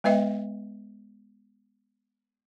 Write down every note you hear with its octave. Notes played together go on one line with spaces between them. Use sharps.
G#3 B3 B4 D#5 E5 G5